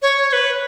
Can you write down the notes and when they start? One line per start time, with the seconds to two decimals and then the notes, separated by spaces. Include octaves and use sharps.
0.02 C#5
0.28 C#5
0.33 B4